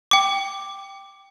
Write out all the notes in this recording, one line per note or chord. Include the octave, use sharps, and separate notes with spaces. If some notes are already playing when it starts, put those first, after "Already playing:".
G5 D6